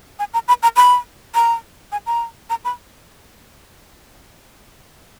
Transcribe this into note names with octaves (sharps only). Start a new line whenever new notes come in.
G#5
A#5
B5
A#5
B5
A#5
G#5
A#5
A#5
B5